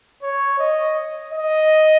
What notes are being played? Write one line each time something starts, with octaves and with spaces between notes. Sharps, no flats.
C#5
D#5
D#5